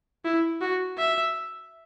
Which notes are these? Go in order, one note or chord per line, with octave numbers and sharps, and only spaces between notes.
E4
F#4
E5